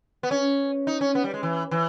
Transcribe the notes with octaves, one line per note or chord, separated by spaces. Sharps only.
B3
C#4
D#4
C#4
B3
G3
G#3
E3
E3